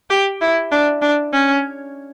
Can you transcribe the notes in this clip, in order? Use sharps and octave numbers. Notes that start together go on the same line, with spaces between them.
G4
E4
D4
D4
C#4